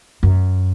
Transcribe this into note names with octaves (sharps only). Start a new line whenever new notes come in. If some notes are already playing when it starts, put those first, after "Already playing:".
F#2